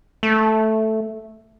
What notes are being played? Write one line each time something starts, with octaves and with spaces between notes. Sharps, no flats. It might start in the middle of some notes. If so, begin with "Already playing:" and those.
A3